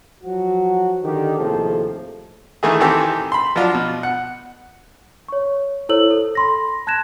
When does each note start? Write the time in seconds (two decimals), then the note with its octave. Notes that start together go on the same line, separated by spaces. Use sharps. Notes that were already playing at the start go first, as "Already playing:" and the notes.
0.24 F3 F#3 F#4
1.03 D3 D#3 G4
1.37 D#2 A2 C3 F3 G#4 A4
2.63 D#3 E3 A3 G#4
2.80 D#3 E3 C4 G4 A4
3.32 B5 C6
3.56 F3 F#3 D4 F4
3.74 B2
4.03 F#5
5.28 C#5 C#6
5.89 E4 A4 C5 C#5 E6 F#7
6.10 A4
6.35 B5 C6 A#6
6.87 A5 F#6 G#6 A#6 E7